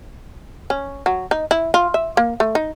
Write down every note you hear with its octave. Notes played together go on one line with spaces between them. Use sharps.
C#4
F#3
D#4
E4
F4
E5
A#3
A3
D#4